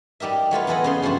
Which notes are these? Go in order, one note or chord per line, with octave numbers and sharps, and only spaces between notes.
G3 D#4 G4 A#4 E5
F#3 A3 F4 B4
E2 G#4 A4 B4 D#5 F#5
C#3 B3 C6
G2 F3 A3 F#4 C5